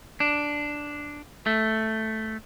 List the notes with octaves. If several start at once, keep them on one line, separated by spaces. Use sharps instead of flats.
D4
A3